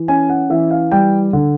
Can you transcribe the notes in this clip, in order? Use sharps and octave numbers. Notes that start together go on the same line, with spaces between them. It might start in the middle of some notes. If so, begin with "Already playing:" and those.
Already playing: E3
C#4 G#5
F#5
E3 E5
F5
G3 G5
D3